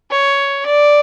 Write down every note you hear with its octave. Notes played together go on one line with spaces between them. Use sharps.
C#5
D5